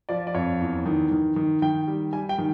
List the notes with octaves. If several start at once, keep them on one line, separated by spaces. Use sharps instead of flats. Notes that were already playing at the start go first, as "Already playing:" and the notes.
F3 D5
D5
F2 C#5
E2
D#3
D#3
D#3
D#3 G5
G3
G3 G#5
G5
D#3